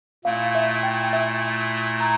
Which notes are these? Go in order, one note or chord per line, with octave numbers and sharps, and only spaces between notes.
A#2 A3 E4 F5
E5
G5
E5
A#5